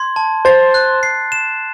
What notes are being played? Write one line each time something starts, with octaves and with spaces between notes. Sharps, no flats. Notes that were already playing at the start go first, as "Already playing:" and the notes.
Already playing: C6 G#6
A5
C5 A6
F#6
C7
E7